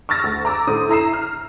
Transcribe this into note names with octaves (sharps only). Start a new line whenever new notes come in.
C#6 E6 F6 A6 A#6
D2
A#5 D6 E6
A2 D3 C5 D#6
E4 A#5 C7 E7
F6